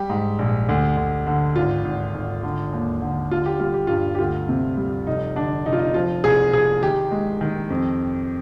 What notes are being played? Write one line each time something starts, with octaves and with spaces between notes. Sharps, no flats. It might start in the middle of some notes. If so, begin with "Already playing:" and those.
Already playing: G3 G4
G#2
A#1
D2
D2
D3
G#1 F4
G#1
G#1
D3
D#2
D3
D3 F4
G4
G3 F4
G4
G2 F4
G4
D2 F4
C3
G3
F1 D#4
D3 D4
F1 D#4
F4
D#4
F3 F4
C2 G#4
C2 G#4
D#3 G4
G#3
D#3
F2